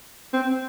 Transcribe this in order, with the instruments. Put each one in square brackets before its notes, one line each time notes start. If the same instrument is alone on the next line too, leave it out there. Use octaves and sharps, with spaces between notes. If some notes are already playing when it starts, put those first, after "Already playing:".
[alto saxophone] C4